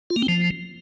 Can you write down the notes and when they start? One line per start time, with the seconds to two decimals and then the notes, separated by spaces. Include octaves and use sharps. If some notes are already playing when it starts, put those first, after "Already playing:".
0.10 F4
0.16 A#3
0.22 C4
0.28 F3